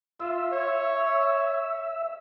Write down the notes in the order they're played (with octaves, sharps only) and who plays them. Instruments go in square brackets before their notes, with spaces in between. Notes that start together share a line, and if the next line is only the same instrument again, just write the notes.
[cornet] F4 [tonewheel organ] E5
[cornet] C#5